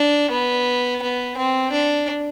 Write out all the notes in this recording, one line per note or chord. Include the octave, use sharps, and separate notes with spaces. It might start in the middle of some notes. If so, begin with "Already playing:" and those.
Already playing: D4
B3
B3
C4
D4